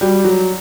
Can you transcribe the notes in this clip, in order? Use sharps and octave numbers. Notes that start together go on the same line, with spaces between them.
G3 F#4
F#3